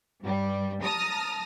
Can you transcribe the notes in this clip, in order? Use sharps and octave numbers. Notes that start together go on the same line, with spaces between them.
G2 G3
A5 A#5 D#6 F6